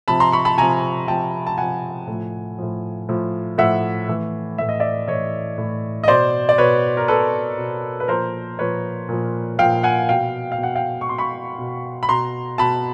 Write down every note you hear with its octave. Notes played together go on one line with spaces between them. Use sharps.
C3 F3 A5 B5
A#5 C6
B5 C#6
A5 B5
C3 F3 G#5 A#5
C3 F3 G5 A5
A5
C3 F3 F#5 G#5
A2 F3
A2 F3
A2 F3
A2 F3 E5 F#5
A2 E3
A2 E3 E5
D#5
D5 E5
A2 E3 C#5 D#5
A2 E3
D#5
B2 C5 D5
D5
B2 B4 C#5
A#4
B2 A4 B4
B2
B4
A#2 F3 A#4 C5
A#2 F3 B4 C#5
A#2 F3
A#2 F3 F5 G5
F#5 G#5
B2 F5 G5
F5
B2
F#5
F5 G5
C#6
B2 C6
B5 C#6
B2
B5
B2 A#5 C6
B2 A5 B5